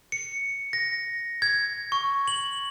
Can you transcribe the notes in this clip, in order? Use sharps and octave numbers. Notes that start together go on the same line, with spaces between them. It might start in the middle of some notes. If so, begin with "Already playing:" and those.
C#7
A#6
G#6
C#6
F#7